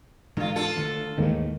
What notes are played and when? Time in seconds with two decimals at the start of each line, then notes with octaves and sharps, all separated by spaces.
0.37 G#2 D3 E3 F4
0.56 D4 F4 A4
0.76 D3 D#3 A3
1.18 D#2 G#2 D#3 E3 A3